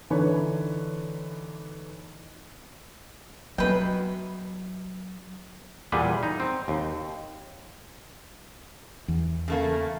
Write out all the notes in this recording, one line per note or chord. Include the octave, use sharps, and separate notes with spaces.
D3 E3 D4 D#4 B4 C#5
F#2 B2 F#3 B4 G5
E2 A#2 G3 G#4 B4
D#4
C4
D#2
E2
C#3 A3 A#3